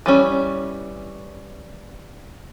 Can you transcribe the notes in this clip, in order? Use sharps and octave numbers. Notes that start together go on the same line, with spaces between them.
E3 G3 C#4